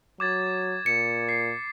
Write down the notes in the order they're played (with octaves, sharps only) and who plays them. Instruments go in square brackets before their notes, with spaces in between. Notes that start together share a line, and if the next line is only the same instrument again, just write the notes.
[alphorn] F#3 [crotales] D6 G#6 A6
[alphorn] A#2 [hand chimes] C#7
[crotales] C7